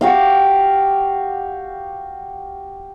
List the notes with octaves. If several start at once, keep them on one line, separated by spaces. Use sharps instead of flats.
F#4 G4 F5